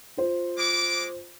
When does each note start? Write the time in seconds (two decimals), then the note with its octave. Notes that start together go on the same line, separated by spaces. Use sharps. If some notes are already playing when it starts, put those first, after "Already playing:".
0.17 F4 C5
0.58 G#3 D6